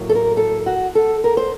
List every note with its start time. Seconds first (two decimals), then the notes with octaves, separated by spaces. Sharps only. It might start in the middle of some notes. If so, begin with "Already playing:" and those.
Already playing: A2 F#3 A#3
0.09 A4
0.15 A#4
0.37 A4
0.66 F#4
0.95 A4
1.24 A#4
1.37 C5